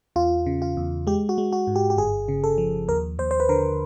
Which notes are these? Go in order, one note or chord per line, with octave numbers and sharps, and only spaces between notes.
E2 F4
C#3
F4
E2
G#3 G4
F#4
G#3
F#4
G#2
G4
G4
G1 G#4
C#3
A4
F3
D#2 A#4
D#2 C5
C5
B4
D3 A#4